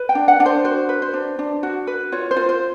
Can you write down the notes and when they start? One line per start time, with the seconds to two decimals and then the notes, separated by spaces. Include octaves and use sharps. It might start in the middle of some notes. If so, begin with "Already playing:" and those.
Already playing: B4
0.09 G5
0.15 D4
0.28 F#5
0.40 D4
0.46 C5
0.65 F#4 C5
0.89 B4
1.02 C5
1.14 D4
1.39 D4
1.63 F#4
1.87 B4
2.12 F4 C#5
2.31 C5
2.36 F4
2.49 C5